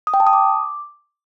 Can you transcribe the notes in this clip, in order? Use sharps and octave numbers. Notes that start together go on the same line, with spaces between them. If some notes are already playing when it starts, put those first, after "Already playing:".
D#6
G5
A5
D#6
D6